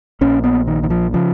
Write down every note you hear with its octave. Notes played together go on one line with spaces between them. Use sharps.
A#1 A#2 C#4
B3
D#3
D#3
F3
C#3 F3